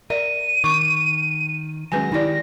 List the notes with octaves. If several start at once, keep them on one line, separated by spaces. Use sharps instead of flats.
A#4 D5 E5 D#7
D#3 C#6 D6
D#3 F#3 G#3 C#4 B4 G#5 A#6
D#3 D#4 E4 G4 D5